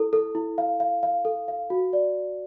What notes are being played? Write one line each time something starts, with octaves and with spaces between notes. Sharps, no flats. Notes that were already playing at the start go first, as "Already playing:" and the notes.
Already playing: E4 A4
A4
E4
F5
F5
F5
A4
F5
F#4
D5